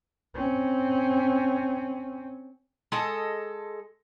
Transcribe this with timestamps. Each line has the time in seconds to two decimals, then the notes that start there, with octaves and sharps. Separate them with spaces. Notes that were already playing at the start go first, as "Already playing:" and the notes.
0.35 C4 C#4
2.92 G#3 A4 D#5